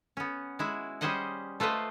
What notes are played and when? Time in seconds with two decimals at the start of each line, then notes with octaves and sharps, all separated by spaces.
0.17 B3 C#4
0.59 G#3 E4 F#4
1.01 G3 C#4 G#4 C5 D#5 F#5
1.60 A3 F4 B4 C5 D#5